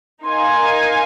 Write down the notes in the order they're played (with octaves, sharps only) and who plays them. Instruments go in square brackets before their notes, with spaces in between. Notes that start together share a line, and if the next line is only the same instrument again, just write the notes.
[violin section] D#4 A#4 F5 G#5 [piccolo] C6